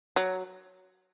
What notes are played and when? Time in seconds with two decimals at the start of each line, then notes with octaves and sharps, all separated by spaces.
0.16 F#3